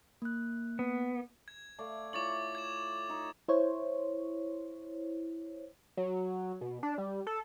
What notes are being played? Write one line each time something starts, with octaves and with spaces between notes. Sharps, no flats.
A#3 F#6
B3
G#6
A3 D5 F5
E4 F4 C#5 D6 A6 F#7
G#6 E7
D#4
E4 C5 C#5
F#3
B2
D4
G3
A4